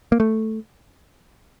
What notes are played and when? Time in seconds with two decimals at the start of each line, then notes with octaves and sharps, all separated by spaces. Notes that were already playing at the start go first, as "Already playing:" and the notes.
0.12 A#3
0.20 A3